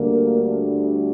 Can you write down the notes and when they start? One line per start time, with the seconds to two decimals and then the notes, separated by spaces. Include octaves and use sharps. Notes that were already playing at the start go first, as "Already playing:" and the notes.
Already playing: D2 D3 G3 A#3